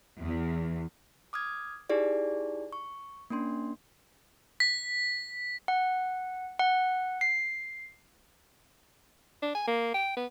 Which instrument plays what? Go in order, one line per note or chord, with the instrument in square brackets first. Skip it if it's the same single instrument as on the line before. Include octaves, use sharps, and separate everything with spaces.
[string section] E2
[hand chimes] D6 D#6 F6 G#6
D#4 E4 G4 G#4 D5
C#6
A#3 C#4 D4 C6
[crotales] B6
[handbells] F#5
F#5
C7
[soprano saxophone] D4
G#5
A#3
G5
B3